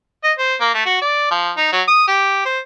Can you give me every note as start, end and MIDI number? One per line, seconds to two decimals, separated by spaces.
0.24 0.33 75
0.39 0.55 72
0.61 0.70 58
0.74 0.85 57
0.86 1.00 66
1.02 1.31 74
1.31 1.51 53
1.57 1.69 63
1.72 1.82 54
1.88 2.06 87
2.08 2.45 67
2.46 2.59 72